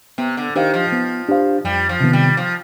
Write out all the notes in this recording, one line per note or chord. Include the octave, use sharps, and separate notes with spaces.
C3 B3
D3
D#3 D4 G4 C5 F5
F3
B3
D4 G4 C5 F5
F2 G3
F3
C3 D#3 B3
G3
F3